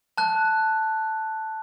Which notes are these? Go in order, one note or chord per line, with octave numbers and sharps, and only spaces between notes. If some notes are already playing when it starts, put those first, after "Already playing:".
A5 F#6